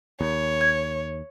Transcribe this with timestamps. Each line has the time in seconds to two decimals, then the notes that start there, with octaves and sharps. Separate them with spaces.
0.21 D#2 C#5
0.61 G#6